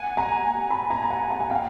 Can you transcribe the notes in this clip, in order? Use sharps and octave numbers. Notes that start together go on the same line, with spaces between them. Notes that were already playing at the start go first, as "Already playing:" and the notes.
Already playing: F#5 G#5
G#5 A#5
A5 B5
G#5 A#5
A5
F#5 G#5
F#5 G#5
G#5
F5 G5